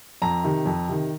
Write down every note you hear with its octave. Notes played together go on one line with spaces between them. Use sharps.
F2 A#5
C3 D#3
F2
C3 D#3